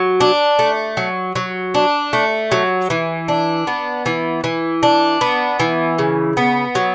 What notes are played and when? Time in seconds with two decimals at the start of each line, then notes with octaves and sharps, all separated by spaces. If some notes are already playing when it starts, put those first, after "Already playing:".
Already playing: F#3
0.21 D4
0.59 A3
0.97 F#3
1.36 F#3
1.74 D4
2.13 A3
2.52 F#3
2.90 E3
3.28 D4
3.67 B3
4.06 E3
4.44 E3
4.83 D4
5.21 B3
5.60 E3
5.99 C#3
6.37 B3
6.75 F#3